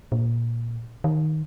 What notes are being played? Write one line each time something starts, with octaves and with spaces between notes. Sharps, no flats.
A#2
D#3